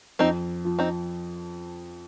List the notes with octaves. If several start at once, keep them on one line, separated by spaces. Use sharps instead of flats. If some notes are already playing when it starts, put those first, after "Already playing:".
F2 C4 D#4
F3
C4 D#4